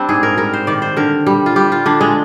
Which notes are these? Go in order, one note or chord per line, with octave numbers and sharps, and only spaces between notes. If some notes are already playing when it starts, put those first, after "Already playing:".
Already playing: G3 C4 D4
G#2 G#4
A#4
G3 A#4
C5
D#3 D5
C5
D3 A#4
G3
F4
G3 G4
F4
D3 D4
G#3